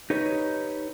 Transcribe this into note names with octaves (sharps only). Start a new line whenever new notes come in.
D#4 G4 B4 C#5